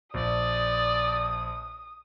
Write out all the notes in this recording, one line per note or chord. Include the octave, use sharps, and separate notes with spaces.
A#1 D5 D#6